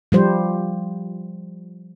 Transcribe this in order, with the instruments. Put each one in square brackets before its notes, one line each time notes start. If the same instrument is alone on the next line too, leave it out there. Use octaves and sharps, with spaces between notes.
[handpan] F3 G3 C5